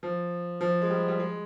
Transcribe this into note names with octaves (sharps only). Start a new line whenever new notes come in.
F3
F3
G#3
G3
G3
G#3